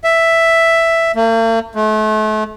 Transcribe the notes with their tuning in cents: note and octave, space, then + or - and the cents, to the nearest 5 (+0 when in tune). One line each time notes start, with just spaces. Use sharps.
E5 +5
A#3 -45
A3 -35